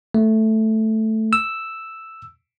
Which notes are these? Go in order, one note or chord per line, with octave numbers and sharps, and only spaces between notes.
A3
E6